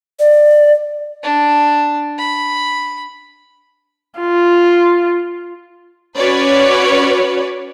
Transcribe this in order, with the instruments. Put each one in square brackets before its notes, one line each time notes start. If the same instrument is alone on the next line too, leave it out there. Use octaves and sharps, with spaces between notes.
[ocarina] D5
[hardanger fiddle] D4
B5
[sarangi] F4
[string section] C#4 F#4 B4 C#5 D5